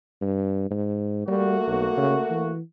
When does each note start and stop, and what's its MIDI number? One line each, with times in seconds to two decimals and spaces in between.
0.22 0.68 43
0.70 1.25 44
1.28 1.57 55
1.28 2.53 57
1.28 2.53 58
1.28 2.53 66
1.67 1.88 35
1.97 2.17 49
2.30 2.61 52